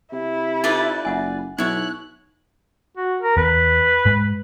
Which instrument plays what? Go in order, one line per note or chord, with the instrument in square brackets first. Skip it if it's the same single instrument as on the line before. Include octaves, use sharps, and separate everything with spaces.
[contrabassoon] C3 [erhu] E4
[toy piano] D#4 A4 A5 [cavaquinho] F4 B4 D5
[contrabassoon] F#1 [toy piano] E5 F#5 G#5
[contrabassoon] B1 [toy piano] D#4 E5 [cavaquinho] E4 C#5 [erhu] F#6
[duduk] F#4
A#4
[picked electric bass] E2 [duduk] B4
[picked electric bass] G#2 G#3